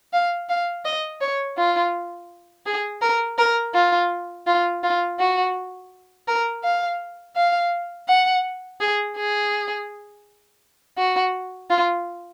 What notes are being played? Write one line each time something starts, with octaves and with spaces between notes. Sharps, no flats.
F5
F5
D#5
C#5
F4
G#4
A#4
A#4
F4
F4
F4
F#4
A#4
F5
F5
F#5
G#4
G#4
F#4
F4